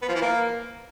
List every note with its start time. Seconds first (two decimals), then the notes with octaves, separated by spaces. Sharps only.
0.02 B3
0.08 F3
0.15 E3
0.21 A#3